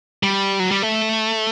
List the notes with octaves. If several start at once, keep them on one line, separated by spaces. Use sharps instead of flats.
G3
F#3
G3
A3